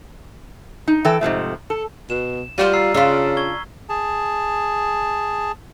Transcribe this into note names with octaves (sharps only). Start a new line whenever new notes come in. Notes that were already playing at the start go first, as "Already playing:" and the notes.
D#4
E3 A4 G5
G#2 C3 F3 A3
A4
B2 E7
G3 F4 F#4 C5 F6 A6 D#7
A#5 E6 C7
C#3 D4 F4 E6 B6
C#6 G#6 G7
G#4 A5